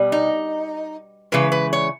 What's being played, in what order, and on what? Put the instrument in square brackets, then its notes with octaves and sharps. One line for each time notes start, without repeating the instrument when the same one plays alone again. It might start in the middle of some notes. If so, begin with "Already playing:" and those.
Already playing: [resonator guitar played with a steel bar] B2 G3
D#4
C#3 E3 G#3 B4
B4
C#5